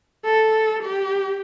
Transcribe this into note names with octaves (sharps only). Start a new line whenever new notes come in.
A4
G4